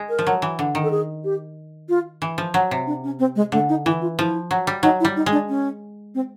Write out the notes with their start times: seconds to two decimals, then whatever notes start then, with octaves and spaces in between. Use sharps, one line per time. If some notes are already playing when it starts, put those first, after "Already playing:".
Already playing: G#3
0.09 A#4
0.19 F3
0.27 F#3
0.42 E3
0.59 D3
0.75 D#3
0.83 A4
0.91 G#4
1.24 G4
1.89 F4
2.22 E3
2.38 F3
2.54 F#3
2.71 C3
2.87 D4
3.04 C#4
3.19 C4
3.36 G#3
3.52 D3 A3
3.69 D#4
3.85 E3 E4
4.02 F4
4.19 F3 E4
4.51 F#3
4.67 G3
4.83 F#3 D#4
5.00 E4
5.05 G3
5.16 D#4
5.26 G#3
5.32 D4
5.49 C#4
6.15 C4